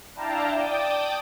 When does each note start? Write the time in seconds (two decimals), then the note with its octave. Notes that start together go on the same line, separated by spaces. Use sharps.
0.16 D4 E4 F5 G5 A5 A#5
0.56 D5 G5 A5 D6 D#6